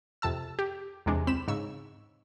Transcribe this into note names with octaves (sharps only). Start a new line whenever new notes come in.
F2 C3 A5 E6
G4
E2 C3 G#3 D4
C#2 C4 B5 E7
G#2 C#3 C#6 E6